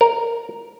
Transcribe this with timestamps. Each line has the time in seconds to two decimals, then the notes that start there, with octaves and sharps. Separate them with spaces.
0.01 A#4